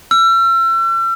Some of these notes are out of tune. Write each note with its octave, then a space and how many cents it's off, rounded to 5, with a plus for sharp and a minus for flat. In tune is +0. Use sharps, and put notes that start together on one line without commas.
E6 +40